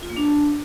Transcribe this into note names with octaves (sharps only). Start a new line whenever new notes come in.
F4
A#3
D4